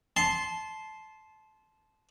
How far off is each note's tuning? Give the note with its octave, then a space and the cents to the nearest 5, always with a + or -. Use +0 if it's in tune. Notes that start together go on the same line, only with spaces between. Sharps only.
A5 -20 C6 +0